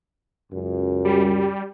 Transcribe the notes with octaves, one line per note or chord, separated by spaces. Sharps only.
C#2 F#2
G3